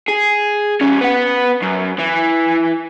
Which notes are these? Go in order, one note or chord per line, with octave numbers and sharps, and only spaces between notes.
G#4
G3 C#4
B3 F#5
F#2
E3